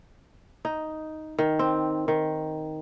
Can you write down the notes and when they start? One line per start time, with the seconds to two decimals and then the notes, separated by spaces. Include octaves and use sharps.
0.65 D#4
1.39 D#3
1.59 C4
2.08 D#3